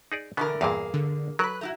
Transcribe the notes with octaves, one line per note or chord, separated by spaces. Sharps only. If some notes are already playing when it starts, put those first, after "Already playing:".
D#4 G#4 D5
B2 D3 E3 B3 A#4
E2 G2 A#2 A#3 G#4
D3
F#3 A#4 B4 F#6
A3 E4 F#4 A#5